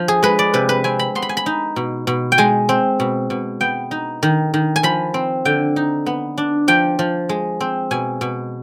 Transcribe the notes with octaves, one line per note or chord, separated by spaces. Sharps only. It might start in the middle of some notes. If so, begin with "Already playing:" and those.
Already playing: F3
G#4
G#3 B4
D5
C3 B4
B4
C4 G#5
B5
B3 C6
B5
G#5
B5
D#4
B2
B2
G5
G#3 G#5
C4
B2
B2
B3 G5
D#4
D#3
D#3
G#5
F3 B5
C4
D3 G5
D#4
B3
D4
F3 G5
F3
G#3
C4
B2 G#5
B2